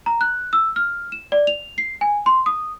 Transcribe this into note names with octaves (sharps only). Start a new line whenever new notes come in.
A#5
F#6
E6
F6
E7
D5
F7
C7
G#5
C6
D#6